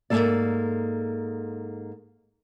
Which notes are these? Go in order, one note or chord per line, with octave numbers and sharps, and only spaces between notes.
G#2 C#3 A#3 A4 D5